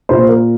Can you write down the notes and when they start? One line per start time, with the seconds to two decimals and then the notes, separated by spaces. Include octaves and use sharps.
0.09 A#2 C5
0.29 A#4